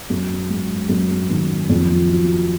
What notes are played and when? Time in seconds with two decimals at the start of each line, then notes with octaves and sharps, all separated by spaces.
0.10 F#2
0.50 G#3
0.89 F#2
1.30 D#3
1.69 F2
2.09 F#3